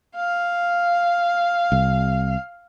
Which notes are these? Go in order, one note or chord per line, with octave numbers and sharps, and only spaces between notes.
F5
C2